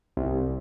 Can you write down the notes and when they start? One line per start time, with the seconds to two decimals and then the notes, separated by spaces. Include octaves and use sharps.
0.17 C2